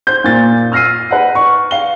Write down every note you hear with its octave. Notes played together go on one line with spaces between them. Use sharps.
C5 G6
A#2 A6
E6 F6 A#6 C7 D#7
B4 F#5
C#6
F5 G7